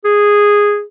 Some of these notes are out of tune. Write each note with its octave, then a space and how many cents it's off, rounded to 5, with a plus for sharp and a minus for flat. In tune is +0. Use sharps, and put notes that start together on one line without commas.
G#4 -10